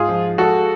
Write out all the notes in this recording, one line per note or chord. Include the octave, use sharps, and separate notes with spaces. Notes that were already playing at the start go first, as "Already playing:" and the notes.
Already playing: G#2 F4 G#4
F3
G#3 F#4 A4